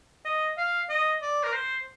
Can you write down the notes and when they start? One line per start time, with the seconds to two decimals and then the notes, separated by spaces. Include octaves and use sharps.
0.25 D#5
0.57 F5
0.89 D#5
1.22 D5
1.44 A#4
1.53 C5